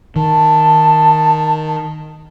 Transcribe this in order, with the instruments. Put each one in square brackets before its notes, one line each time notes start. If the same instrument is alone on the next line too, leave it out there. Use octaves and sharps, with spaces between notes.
[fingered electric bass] D#3 [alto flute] A5